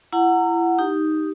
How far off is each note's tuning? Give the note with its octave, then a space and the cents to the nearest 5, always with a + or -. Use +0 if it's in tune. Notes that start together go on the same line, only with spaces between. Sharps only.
E4 +30 F#5 +0 A#5 -25
D#4 +0 G4 +0